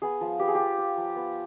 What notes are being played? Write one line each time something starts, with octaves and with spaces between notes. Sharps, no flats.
B3 G#4
F3
B3 G4
G#4
F4 G4
F4
F3
B3